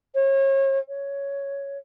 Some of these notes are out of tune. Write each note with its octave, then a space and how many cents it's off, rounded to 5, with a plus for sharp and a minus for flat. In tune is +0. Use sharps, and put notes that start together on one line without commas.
C#5 -35
C#5 +5